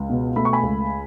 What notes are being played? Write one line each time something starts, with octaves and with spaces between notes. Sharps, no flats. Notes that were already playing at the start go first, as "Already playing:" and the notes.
Already playing: C#2
B2
A3 B5
C#6
G#5 B5
C#2